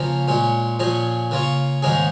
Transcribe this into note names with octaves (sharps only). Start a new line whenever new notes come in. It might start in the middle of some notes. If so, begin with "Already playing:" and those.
Already playing: C#3 F3 A#3 C#4 A#4
A#2 G#3 C#4
A#2 F3 C#4 G#4 D#5
C#3 A#3 F4 C#5
G#2 D#3 A#3 C#4 G#4